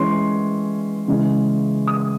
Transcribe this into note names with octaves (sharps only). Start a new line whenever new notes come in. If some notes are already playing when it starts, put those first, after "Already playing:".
Already playing: E3 G#3 C#4 C#5 C6
C#3 E3 G#3 C#4
D#6